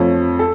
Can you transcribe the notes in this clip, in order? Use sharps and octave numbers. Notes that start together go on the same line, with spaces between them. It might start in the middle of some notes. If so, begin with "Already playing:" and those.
Already playing: F2 F3 A3 C#5
A4